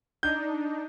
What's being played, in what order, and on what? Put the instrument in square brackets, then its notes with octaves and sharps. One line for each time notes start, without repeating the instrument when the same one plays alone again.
[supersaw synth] D4 D#4 [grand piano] G6